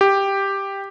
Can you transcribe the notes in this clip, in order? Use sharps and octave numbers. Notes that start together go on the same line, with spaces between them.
G4